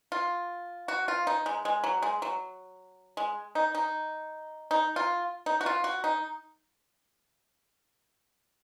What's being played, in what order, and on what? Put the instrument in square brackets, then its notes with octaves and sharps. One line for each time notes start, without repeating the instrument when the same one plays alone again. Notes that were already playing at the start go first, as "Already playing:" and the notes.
[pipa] F4
F#4
F4
D#4
G#3
G#3
F#3
G#3
F#3
G#3
D#4
D#4
D#4
F4
D#4
F#4
F4
F#4
D#4